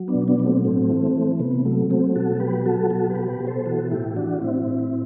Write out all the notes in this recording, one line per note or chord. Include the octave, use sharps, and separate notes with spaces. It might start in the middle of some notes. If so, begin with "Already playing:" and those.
Already playing: F#3
B3 D4
B2
B3 D4
F#3
A3 C4
A2 A3 C4
E3
E3
C3 B3
F#3 A3
F#3 A3 C4
B2 F#4 A4
F#3 G4 B4
F#3 F#4 A4
B2 F#4 A4
G4 B4
B2
G4 B4
B2
A4 C5
E3 F#4 A4
A2 E4 G4
E3 D4 F#4
A2 C4 E4
A2